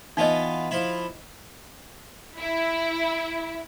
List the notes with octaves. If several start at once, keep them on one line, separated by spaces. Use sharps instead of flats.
E3 B3 D#4 F4 D#5
F3 E4
E4